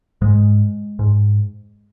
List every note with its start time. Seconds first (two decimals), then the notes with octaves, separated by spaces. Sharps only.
0.22 G#2 G#3
0.99 G#2